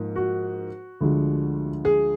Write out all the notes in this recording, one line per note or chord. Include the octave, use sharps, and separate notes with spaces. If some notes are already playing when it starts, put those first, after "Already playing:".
Already playing: G#2 F3 A#3
F#4
D2 D3 F3 G#3
G#4